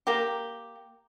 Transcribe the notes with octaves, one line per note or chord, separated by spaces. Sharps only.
A#3 G4